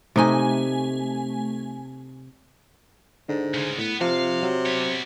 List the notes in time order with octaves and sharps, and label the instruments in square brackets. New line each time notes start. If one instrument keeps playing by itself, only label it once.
[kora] C3 D#4 [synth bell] A3 G#5
[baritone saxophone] G#2 [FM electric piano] D3
[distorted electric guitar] C#3 G#3
[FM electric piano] A2 [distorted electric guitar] B3
[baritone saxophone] C3 [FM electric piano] F3 [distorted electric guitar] F5
[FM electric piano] F#3
[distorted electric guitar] B3 C#5